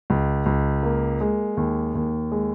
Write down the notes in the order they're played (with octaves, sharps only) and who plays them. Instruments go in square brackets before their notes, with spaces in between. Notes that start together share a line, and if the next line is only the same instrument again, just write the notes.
[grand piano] C#2
C#2
A#3
G#3
D#2
D#2
G#3